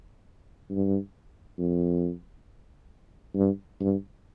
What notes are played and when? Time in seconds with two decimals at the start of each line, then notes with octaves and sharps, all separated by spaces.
0.71 G2
1.58 F2
3.35 G2
3.80 G2